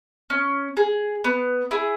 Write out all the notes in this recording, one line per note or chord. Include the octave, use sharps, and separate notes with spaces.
C#4
G#4
B3
E4 G#4